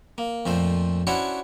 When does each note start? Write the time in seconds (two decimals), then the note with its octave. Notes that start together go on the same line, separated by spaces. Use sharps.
0.18 A#3
0.46 F2 A#2 A3 C5
1.07 C#4 D4 E4 F#4 C5 C#5